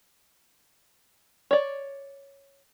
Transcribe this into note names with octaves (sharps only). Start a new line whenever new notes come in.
C#5 D5